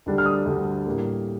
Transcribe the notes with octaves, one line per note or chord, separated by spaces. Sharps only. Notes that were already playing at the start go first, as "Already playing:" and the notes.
D2 D3 G3 D4
F6
D#6
D2 D3 G3 D4
A2 G3 A#3